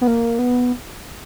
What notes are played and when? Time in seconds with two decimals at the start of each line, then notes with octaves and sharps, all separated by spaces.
0.01 B3
0.07 A#3
0.39 B3